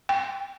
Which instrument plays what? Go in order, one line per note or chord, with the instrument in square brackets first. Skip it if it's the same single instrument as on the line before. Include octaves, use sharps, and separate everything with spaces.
[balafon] G5